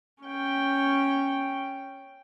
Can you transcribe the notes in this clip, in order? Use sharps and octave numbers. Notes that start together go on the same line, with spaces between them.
C#4 G5